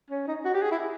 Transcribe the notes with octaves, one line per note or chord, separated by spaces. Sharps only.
C#4
D#4
F#4
G4
G#4
E4